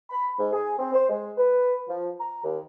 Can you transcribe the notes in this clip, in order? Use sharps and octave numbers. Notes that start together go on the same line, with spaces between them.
B5
G#2
G#4
C4
C5
G#3
B4
F3
A#5
D#2